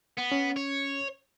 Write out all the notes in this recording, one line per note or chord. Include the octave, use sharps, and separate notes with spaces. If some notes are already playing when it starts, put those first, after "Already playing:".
B3
C#4
C#5